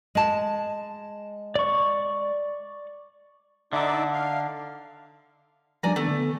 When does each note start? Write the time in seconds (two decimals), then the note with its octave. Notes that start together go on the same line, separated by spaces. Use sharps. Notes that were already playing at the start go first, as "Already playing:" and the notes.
0.15 G#3 A5
1.56 D5 C#6
3.73 D3 D#4 D5 E5
4.12 F5
5.83 F3 G3 D4 D5 G#5 A#5
5.96 D#3 A3 B3 D4
6.08 D3 B3